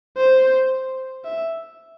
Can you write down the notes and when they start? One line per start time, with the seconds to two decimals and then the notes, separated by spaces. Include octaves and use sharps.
0.17 C5
1.25 E5